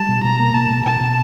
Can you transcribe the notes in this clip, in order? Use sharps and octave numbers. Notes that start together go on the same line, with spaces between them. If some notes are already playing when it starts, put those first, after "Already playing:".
Already playing: G3 A5
B2
B2 A#5
A#3
B2 A5
B2
B2 A5
B2